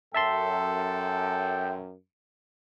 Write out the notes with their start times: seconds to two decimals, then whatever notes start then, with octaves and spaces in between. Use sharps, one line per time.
0.14 F#2 A4 E5 G5 A5 C6